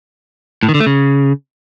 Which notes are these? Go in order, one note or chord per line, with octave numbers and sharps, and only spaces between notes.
A2
D#3
D3
A3
C#3